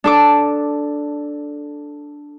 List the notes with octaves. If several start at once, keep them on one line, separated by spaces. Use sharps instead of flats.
D4 A4 D6